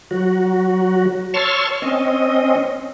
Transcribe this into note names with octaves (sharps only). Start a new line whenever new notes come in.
F#3 F#4
C#5 A5 C6 C#6 E6 F6
C4 C#4 D#5